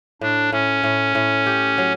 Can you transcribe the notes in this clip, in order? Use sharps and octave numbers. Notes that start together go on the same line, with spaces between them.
A2 D4
A2 C#4
A2
A2
G4
F#3